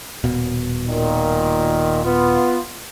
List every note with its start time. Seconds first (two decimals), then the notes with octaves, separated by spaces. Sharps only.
0.24 D#1 B2
0.89 A#2 D#3
2.05 B3 F4